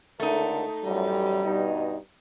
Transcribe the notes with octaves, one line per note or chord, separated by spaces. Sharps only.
C#2 D3 A3 D#4 A#4
A1 F#2 G3
G2 B2 D#4